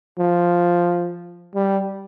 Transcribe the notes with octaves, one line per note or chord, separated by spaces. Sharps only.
F3
G3